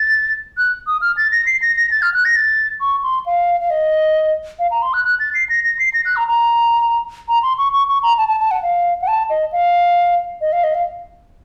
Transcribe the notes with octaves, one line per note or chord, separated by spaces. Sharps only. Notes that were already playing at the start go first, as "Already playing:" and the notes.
Already playing: A6
F#6
D#6
F6
A6
A#6
C7
A#6
A#6
A6
F6
F#6
A#6
A6
C#6
C6
F5
F5
D#5
F5
A#5
C6
F#6
F#6
A6
C7
A#6
A#6
C7
A#6
F#6
A#5
A#5
A#5
C6
C#6
C#6
C#6
A#5
A5
A5
A5
F#5
F5
F#5
A5
D#5
F5
D#5
F5
D#5
F5